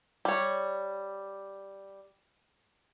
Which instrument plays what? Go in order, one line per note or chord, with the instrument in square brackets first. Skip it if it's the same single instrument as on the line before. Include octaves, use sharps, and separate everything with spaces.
[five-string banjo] G3 C#5